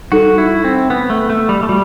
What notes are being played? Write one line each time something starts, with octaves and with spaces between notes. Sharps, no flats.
G3 D#4 F#4 A4
E4
C4
B3
A3
A3
G3
A3
G3 F#4